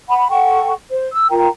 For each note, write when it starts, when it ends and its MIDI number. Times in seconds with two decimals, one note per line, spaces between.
0.08 0.27 78
0.08 0.27 83
0.29 0.71 69
0.29 0.71 78
0.29 0.71 79
0.29 0.71 85
0.91 1.09 72
1.11 1.26 88
1.30 1.47 65
1.30 1.47 70
1.30 1.47 79
1.30 1.47 82